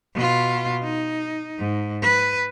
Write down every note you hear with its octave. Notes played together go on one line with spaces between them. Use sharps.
B2 F4
D#4
G#2
B4